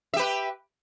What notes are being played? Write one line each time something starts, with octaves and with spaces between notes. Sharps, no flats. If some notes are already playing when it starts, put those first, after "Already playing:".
G4 B4 E5